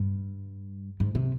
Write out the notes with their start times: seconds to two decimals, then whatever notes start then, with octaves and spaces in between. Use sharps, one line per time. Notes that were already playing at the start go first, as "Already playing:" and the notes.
Already playing: G2
1.00 G#2
1.15 C3